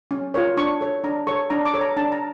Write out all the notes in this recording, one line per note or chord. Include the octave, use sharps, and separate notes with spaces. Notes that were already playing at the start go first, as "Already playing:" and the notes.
C#4
F4 A#4 C#5
D4 C#6
A4 C#5
D4 A#5
A4 C#5 C#6
D4 A#5
D6
A4 C#5
A#5
D4 A5
A#5